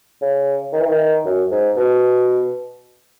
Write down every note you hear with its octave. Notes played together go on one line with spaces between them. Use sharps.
C#3
D#3
E3
D#3
F#2
G#2
B2